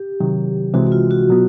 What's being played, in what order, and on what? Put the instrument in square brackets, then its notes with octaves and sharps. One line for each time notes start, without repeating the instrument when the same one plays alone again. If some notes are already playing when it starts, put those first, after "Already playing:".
Already playing: [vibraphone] G4
[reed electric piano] C3 D#3 F#3
[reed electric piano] C2 C3 E3 G#3 [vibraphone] F#4
[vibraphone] F#4
F4
F#4
[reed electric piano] B2 F#3 B3